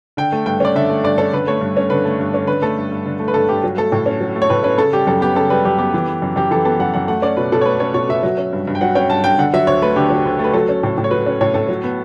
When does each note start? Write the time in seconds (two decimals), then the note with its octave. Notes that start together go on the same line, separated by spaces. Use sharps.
0.17 D3 G5
0.32 A3
0.46 G2 G5
0.60 C#4 D5
0.75 D3 E5
0.90 A3
1.04 G2 D5
1.18 C#4 A4
1.33 D3 B4
1.47 A3 C#5
1.61 G2
1.77 C#4
1.90 D3 B4
2.05 A3
2.20 G2
2.34 C#4
2.47 D3 B4
2.62 A3 A4
2.77 G2
2.92 G2
3.06 D3
3.19 A3
3.28 B4
3.34 G2 A4
3.48 G2 G4
3.64 F#3
3.77 A3 A4
3.92 A2
4.06 C#4
4.21 F#3
4.35 A3
4.42 C#5
4.50 A2 B4
4.64 C#4 B4
4.78 C#3 A4
4.93 G3 G4
5.07 F#2 A4
5.21 B3 G4
5.36 C#3 A4
5.50 G3 B4
5.65 F#2 G4
5.78 B3 G4
5.94 E3
6.08 B3
6.22 F#2
6.36 F#2 G4
6.51 E3 A4
6.65 B3 A4
6.80 F#2 F#5
6.94 F#2 F#5
7.08 A3 F#5
7.22 C#4 D5
7.37 B2 B4
7.52 B2 A4
7.61 C#5
7.65 A3 B4
7.80 C#4 C#5
7.94 B2 C#5
8.09 B2 E5
8.23 F#3
8.38 C#4
8.53 G2
8.67 G2
8.75 G5
8.81 F#3 F#5
8.95 C#4 G5
9.09 G2 A5
9.24 G2 G5
9.38 D3 F#5
9.54 F#3 E5
9.67 D2 C#5
9.82 A3 B4
9.96 D3 G4
10.10 F#3
10.26 D2
10.39 A3
10.44 B4
10.53 F#3 A4
10.69 C#4
10.83 A2
10.98 A2
11.04 C#5
11.11 F#3 B4
11.26 C#4
11.41 A2 C#5
11.54 A2 A4
11.68 F#3
11.83 B3